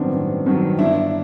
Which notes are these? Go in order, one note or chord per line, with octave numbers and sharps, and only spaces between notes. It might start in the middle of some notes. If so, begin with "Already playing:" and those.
Already playing: A1 G2 D#3 F#3 B3 C4 D4
A1
G2 D#3 F#3
G1 D4 E4